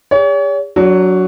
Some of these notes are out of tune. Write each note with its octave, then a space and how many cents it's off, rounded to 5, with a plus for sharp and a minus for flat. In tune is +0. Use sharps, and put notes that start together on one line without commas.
G#4 -45 C#5 +40
F#3 +0 D4 -25